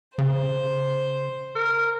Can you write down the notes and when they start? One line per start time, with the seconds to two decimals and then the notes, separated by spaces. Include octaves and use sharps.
0.18 C#3 C5
1.55 A#4